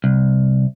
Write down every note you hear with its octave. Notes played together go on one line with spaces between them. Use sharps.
C2